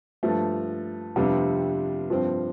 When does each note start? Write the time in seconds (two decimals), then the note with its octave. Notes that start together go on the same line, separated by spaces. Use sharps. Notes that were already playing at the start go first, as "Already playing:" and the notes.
0.23 G2 F3 A3
1.16 F2 C3 G3 B3 D4
2.10 G2 F3 C4